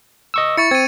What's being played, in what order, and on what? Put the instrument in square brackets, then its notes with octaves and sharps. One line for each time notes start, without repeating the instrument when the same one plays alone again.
[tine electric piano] D#5 C#6 E6
[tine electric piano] E4 [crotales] C#6 A6 C#7
[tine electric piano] C4 [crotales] G#6 D#7